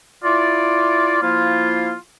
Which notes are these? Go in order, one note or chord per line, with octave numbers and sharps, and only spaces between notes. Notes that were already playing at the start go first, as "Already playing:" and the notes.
E4 F4 D5
F3 A#3 E4 F4